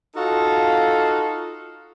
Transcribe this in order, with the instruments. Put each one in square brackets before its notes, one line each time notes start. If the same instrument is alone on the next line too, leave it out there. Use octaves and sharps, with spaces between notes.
[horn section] D#4 F4 F#4 A4 F5